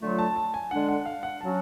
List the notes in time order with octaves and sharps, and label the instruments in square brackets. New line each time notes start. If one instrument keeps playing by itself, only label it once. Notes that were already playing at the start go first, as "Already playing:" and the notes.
[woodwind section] D3 F#3 A3 F4
[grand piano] A5
A5
G#5
[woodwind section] D3 G#3 D4 [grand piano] F#5
[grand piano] F#5
F5
F#5
[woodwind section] F#3 C#4 F#4 [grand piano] A5